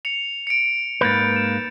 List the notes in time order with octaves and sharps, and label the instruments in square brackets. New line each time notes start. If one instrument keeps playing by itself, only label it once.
[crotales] C#7 F7
C#7 D7
[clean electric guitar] G#2 A#3 B4 [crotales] G6 A6
[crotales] E7